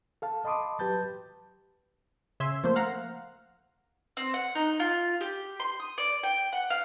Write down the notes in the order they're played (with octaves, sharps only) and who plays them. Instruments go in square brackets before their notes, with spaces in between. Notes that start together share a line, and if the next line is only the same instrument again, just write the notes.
[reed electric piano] A4 F5 A5
D#5 A5 B5 C6 D6 D#6
F#3 G4 B4 A5 G6 A6
[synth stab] C#3 E5 G#5 C6 E6
F3 A3 A#3 C5
F5 F#5 A#5
[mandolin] C4
F#5
D#4
F4
G4
C6
D#6
D5
G5
F#5
F5